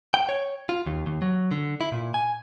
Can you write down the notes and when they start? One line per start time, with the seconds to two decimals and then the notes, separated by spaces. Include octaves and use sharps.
0.14 G5
0.29 C#5
0.69 F4
0.86 D#2
1.06 D#2
1.22 F#3
1.51 D3
1.81 E4
1.92 A#2
2.14 G#5